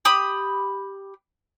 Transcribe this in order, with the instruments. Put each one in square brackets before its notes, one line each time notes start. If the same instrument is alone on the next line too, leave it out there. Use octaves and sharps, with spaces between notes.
[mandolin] G4 B5 D#6